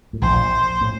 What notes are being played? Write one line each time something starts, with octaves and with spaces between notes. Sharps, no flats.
A2
A#1 A#2 C5
A2